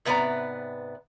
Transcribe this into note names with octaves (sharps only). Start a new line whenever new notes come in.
G#2 C3 B3 B4 D5 A#5